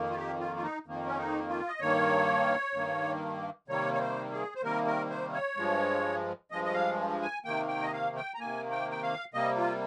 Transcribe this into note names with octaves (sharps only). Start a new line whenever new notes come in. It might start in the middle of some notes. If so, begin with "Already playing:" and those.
Already playing: F2 D#3 A#3
F4
G4
F4
F4
D#4
F2 D#3 A#3
C#4
D#4
F4
D#5
G2 D#3 A#3 C#5
G2 D#3 A#3
C3 D#3 G3 A#3 C#5
C#5
C5
G#4
C5
C3 D#3 G3 A#3 A#4
A#4
C5
C#5
G2 F3 G#3
G2 F3 G#3 D#5
D#5
F5
G#5
C3 D#3 A#3 G5
G5
D#5
F5
G5
A#5
C3 D#3 A#3 G#5
G5
G5
F5
C3 G3 A#3 D#5
F4